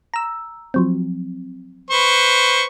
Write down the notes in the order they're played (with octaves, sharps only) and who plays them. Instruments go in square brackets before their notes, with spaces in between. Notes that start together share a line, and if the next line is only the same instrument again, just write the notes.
[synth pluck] A#5 E6
F3 F#3 C4
[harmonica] B4 C5 C#6